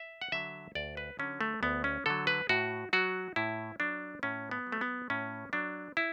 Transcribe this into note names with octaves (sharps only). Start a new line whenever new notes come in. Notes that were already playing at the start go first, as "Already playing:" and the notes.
Already playing: E5
F#5
D3 F#3 E5
D2 D5
B4
D3 F#3 C#4
A3
D2 B3
C#4
D3 F#3 A4
B4
A2 F#4
F#3 F#4
A2 E4
F#3 D4
A2 C#4
B3
F#3
A3
B3
A2 C#4
F#3 D4
E4